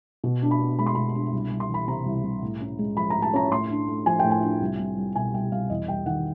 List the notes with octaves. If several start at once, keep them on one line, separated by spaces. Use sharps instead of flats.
B2
D4
B5
B3
G#3 B5
C6
B2 B5
D4
C2
C2
C6
E3
B5
C3 A#5
C2
C2
A2
C#4
G#3
F3 B5
A2 A#5
A5
C#4 A#5
A2 C6
D4
A3
F3 G#5
A2 G5
G#5
D4
C2
C2
G3
B2 G#5
C2 G5
C2 F5
E2 D#5
G3 G5
D#3 F#5